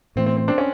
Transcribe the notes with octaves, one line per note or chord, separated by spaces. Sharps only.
A2 E3 A3 C4
C4
C4
C4 D4
C#4